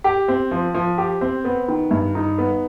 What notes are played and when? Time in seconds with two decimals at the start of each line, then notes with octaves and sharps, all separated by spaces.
0.04 G4
0.28 C4
0.51 F3
0.74 F3
0.98 G4
1.21 C4
1.45 B3
1.68 D#3
1.91 G2
2.15 D#4
2.38 B3